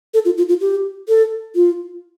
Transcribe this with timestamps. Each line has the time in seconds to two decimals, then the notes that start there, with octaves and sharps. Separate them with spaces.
0.14 A4
0.25 F4
0.38 F4
0.49 F4
0.61 G4
1.08 A4
1.55 F4